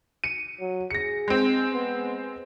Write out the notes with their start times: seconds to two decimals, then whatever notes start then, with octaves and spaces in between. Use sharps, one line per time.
0.24 C#7 D#7
0.60 F#3
0.91 G#4 A#6 C#7
1.28 G#3 C4
1.73 B3